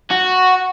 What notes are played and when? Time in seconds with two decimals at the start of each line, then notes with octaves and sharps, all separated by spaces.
0.11 F#4